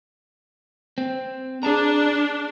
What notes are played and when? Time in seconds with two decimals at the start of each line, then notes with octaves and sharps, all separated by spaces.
0.98 C4
1.63 D4 G#4 A5 A#5